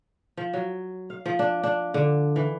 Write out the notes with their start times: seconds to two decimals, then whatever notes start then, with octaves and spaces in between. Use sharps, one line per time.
0.37 F3
0.54 F#3
1.10 F5
1.26 F3
1.39 D4
1.64 D4
1.94 D3
2.36 E3